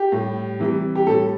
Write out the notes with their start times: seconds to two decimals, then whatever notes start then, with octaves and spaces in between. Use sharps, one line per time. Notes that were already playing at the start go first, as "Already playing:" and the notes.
Already playing: G4
0.12 A2 G3
0.59 C3 E3 G3
0.96 G4
1.07 A2 G3 A4